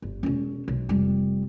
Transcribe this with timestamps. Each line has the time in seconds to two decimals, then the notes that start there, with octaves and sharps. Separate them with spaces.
0.02 G1
0.23 E1 C#4
0.68 B1
0.89 F1 G3